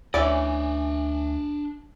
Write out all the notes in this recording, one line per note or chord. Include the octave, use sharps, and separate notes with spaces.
D2 E3 C#4 D4 D5 D#5